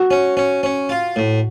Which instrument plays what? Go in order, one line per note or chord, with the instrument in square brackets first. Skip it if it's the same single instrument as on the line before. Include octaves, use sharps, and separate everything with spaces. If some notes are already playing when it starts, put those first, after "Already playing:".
Already playing: [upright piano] F#4
[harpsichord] C#4
C#4
C#4
F4
A2